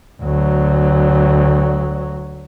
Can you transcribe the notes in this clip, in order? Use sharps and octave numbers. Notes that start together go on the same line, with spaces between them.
D2 F#3